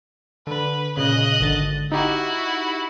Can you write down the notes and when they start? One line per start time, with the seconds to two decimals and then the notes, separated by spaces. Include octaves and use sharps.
0.47 D3 B4
0.97 A#2 C#3 D#5 F#6
1.41 G#1 D3 A6
1.92 D#4 E4 F#4 G4